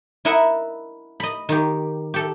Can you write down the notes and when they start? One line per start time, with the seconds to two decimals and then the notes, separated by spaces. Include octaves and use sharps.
0.25 E4 A#4 D#5 E5 F#5
1.20 D#5 B5
1.49 D#3 G4
2.14 G4 A4